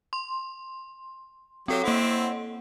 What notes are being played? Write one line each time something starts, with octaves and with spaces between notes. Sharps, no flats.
C6
F#3 C4 G4 A4 C#5
A#3 C4 E4 F#5